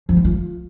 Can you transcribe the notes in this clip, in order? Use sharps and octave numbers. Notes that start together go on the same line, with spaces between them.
F3
D#4
F4